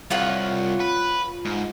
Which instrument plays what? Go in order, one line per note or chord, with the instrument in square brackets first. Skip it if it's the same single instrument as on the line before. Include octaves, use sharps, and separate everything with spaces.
[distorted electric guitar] C2 [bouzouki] F4 C#5 F#5
[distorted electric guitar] B4
G#2